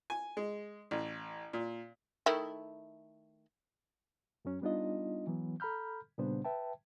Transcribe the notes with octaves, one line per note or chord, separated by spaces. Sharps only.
G#5
G#3
A1
A#2
D#3 A3 E4
F#2 F#3 C#4
G3 B3 D4 D#4 F4 D#5
E3 F#3 B3
A4 A#5 B5 F6 G6
A#2 C#3 G3 B3 D4 C5
B4 E5 G5 A5